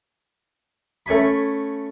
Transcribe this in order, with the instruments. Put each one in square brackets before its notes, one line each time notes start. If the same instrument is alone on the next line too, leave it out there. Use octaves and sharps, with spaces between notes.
[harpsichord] A3 C#4 G#5 B5